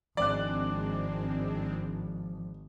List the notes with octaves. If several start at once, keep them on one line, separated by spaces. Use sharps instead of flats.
G#1 F3 G#3 C4 D4 D5 F#6